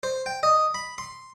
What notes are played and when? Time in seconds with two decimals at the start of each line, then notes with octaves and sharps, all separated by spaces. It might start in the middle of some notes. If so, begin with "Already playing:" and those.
0.03 C5
0.26 G5
0.43 D#5
0.74 B5
0.98 C6